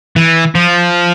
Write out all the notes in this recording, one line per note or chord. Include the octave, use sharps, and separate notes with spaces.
E3
F3